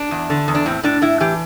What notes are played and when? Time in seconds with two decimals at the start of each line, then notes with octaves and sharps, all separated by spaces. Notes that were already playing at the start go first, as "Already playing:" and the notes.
Already playing: D4
0.11 E2
0.30 D3
0.48 E2
0.55 D4
0.66 A2 C4
0.83 A2 D4
1.02 A2 E4
1.20 E3 G4